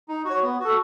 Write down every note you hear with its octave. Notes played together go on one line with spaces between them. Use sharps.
D#4
F#4
C#5
B3
F#4 A4